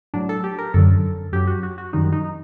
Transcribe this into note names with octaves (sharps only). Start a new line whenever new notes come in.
A2 F#3 D4
A4
G4
A#4
F#2 D3 F#3 A4
F#2 F#3 G4
F#4
F#4
F#4
F#2 D#3 G3 D#4
D#4